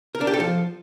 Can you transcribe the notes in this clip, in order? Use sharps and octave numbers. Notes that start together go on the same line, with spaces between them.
A#4
D4
G4
A4
F3